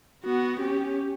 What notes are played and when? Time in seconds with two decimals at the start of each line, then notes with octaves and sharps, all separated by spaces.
0.24 B3 F#4
0.60 C#4 G4